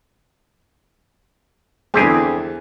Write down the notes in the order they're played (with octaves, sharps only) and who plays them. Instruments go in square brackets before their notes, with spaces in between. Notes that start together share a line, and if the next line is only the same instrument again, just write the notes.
[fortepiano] E2 D3 E3 [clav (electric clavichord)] C4 G4 G#4